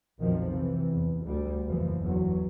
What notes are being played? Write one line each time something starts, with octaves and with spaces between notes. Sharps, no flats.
B1 F2 A#2 D#3 F3
C3 E3
E2
D2 G3
F#1 E2 E3 F3
G1 E2 F#3